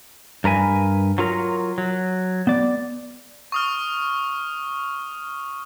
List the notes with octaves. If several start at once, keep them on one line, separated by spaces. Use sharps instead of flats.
G2 A#4 B4 G#5
F#3 F4 A#4
F#3
B3 D5
C#6 D#6 F6